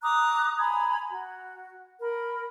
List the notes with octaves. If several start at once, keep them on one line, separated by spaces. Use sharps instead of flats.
A#5 D6 D#6 F#6
G#5 A#5 B5 G#6
F#4
A#4 B5